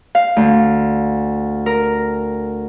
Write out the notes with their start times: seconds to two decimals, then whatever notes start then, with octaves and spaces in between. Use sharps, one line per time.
0.15 F5
0.36 D2
1.66 A#4